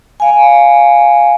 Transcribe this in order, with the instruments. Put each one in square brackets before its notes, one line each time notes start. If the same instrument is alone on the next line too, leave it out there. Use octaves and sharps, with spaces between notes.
[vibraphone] F5 G#5